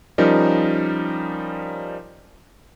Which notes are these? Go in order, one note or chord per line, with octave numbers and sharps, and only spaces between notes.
F3 G3 C#4 D#4 A#4